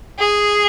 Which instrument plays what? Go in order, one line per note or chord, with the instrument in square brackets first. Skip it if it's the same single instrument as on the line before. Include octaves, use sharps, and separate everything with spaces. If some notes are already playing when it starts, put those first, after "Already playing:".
[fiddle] G#4